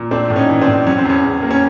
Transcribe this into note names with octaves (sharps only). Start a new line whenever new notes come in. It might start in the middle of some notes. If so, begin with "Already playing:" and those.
Already playing: A#2
A3 C4 D4
A2
C#4 D#4
E3
C4 D4
A2
F#3 C#4
C4
E2 C#4
C#3
A#3
C#4